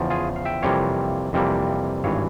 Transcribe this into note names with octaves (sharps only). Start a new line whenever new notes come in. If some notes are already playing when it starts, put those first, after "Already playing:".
Already playing: E2 C#3 F3
F4 G#4
F5
E5 G5
F2 C3 E3 G3 A#3 C#5 F5
F2 C3 E3 G3 A#3
G#1 G2 E3 C#5 F5